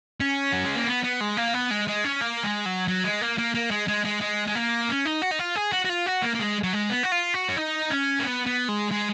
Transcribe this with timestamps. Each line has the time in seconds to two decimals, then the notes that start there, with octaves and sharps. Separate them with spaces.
0.20 C#4
0.52 F#3
0.64 G#3
0.75 A#3
0.87 B3
1.03 B3
1.20 G#3
1.37 A#3
1.54 B3
1.71 G#3
1.88 G#3
2.04 C#4
2.21 A#3
2.43 G#3
2.66 F#3
2.88 F#3
3.04 G#3
3.21 A#3
3.38 A#3
3.55 A#3
3.71 G#3
3.88 G#3
4.05 G#3
4.22 G#3
4.48 G#3
4.55 A#3
4.88 C#4
5.05 D#4
5.22 F#4
5.31 D#4
5.39 F4
5.56 G#4
5.72 F#4
5.85 F#4
5.89 F4
6.06 F#4
6.22 A#3
6.35 A#3
6.39 G#3
6.63 F#3
6.73 G#3
6.90 B3
7.04 F#4
7.12 F4
7.34 F#4
7.49 C#4
7.57 D#4
7.90 C#4
8.19 A#3
8.23 B3
8.46 B3
8.68 G#3
8.91 G#3